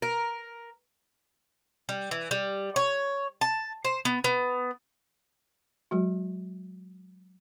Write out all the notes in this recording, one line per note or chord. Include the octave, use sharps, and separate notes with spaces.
A#4
G3
E3
G3
C#5
A5
C5
B3
B3
F#3 G#3 F#4